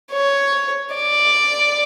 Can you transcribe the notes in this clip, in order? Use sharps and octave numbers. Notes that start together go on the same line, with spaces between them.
C#5
D5